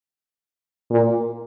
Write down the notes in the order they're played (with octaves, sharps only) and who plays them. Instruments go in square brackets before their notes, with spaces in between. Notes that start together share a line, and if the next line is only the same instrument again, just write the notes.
[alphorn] A#2